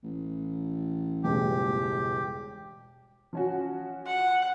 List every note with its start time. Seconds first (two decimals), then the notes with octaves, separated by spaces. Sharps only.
0.03 A1
1.24 E1 C#2 G2 G4
3.33 F3 C#4 F#4
4.06 F#5